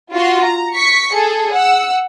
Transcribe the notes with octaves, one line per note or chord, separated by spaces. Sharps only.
F4 F#4 C6
A#5
C#6 B6 C#7
G#4 A4
F#5 E6